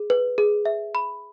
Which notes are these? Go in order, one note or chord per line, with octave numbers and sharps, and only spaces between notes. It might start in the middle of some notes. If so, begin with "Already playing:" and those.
Already playing: G#4
B4
G#4
E5
B5